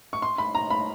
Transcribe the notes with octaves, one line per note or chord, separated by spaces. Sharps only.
C#6
C6
B5
A#5
B5